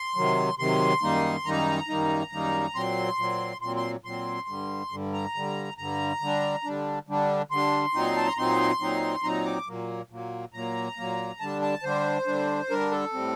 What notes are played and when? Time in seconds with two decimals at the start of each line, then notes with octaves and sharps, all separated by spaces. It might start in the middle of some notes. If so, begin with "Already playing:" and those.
Already playing: C6
0.16 C3 D#3 F#3
0.59 C3 D#3 F#3 C6
1.02 F#2 D#3 G3 A#3 D#4
1.45 F#2 D#3 G3 A#3 D#4 A#5
1.88 F#2 D#3 G3 A#3 D#4
2.32 F#2 D#3 G3 A#3 D#4
2.75 A#2 F#3 C4 C6
3.18 A#2 F#3 C4
3.61 A#2 F#3 C4 C6
3.76 C6
4.04 A#2 F#3 C4 C6
4.48 G2 D3 G3
4.91 G2 D3 G3
5.13 A#5
5.35 G2 D3 G3
5.78 G2 D3 G3 A#5
6.21 D3 G3 D4
6.65 D3 G3 D4
7.08 D3 G3 D4
7.51 D3 G3 D4 C6
7.94 A#2 F#3 C4 D#4
8.16 A5
8.27 A#5
8.37 A#2 F#3 C4 D#4 C6
8.80 A#2 F#3 C4 D#4
9.24 A#2 F#3 C4 D#4 A#5
9.46 D6
9.67 A#2 F#3 A#3
10.10 A#2 F#3 A#3
10.53 A#2 F#3 A#3 A#5
10.97 A#2 F#3 A#3
11.40 D3 G3 D4 A5
11.62 A5
11.83 D3 G3 D4 C5
12.27 D3 G3 D4
12.70 D3 G3 D4 A#4
12.91 A4
13.13 A2 G3 C4